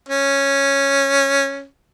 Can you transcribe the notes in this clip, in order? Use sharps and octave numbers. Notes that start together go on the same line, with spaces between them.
C#4